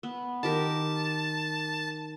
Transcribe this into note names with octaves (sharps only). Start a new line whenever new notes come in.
B3
D#3 G4 A#4 A5